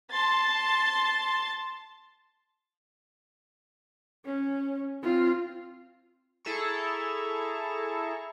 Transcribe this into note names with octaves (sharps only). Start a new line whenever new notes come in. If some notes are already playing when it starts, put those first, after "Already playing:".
A5 C6 A6
C#4
C4 F4
E4 G#4 A4 A5 A#5 C#6